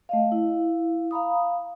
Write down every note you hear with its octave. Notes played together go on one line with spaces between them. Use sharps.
A3 D#5 F5
E4 F5
F5 A#5 B5 D#6